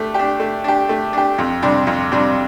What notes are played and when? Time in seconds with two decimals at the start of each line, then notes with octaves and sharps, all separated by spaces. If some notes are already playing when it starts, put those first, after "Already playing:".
Already playing: A3 D4 G4
0.14 D4 G4
0.40 A3
0.64 D4 G4
0.89 A3
1.13 D4 G4
1.38 F2
1.62 C3 G3 D4
1.87 F2
2.12 C3 G3 D4